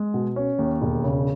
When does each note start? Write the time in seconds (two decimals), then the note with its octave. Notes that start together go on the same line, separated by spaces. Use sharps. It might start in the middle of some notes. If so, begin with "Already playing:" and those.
Already playing: G#3
0.14 B2
0.36 C#4
0.59 D#2
0.82 E1
1.04 C#3